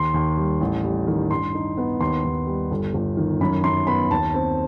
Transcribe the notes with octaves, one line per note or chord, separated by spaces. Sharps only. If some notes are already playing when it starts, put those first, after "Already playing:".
Already playing: D#2 C6
D#2
G3
A1
G3
D#3
G2 C6
D#4
B3
D#2 C6
D#2
G3
G1
G1
D#3
F#2 B5
F#2 C6
B3 B5
D#2 A5
C4